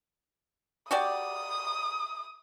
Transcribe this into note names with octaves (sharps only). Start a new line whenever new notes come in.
F#4 G4 D5 D#6